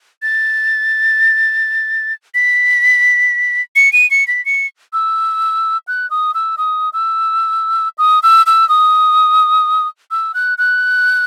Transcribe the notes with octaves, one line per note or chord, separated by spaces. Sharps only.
A6
B6
C#7
D#7
C#7
B6
C#7
E6
F#6
D#6
E6
D#6
E6
D#6
E6
E6
D#6
E6
F#6
F#6